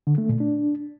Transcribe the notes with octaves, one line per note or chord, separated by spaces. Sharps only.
D3
A3
A#2
D4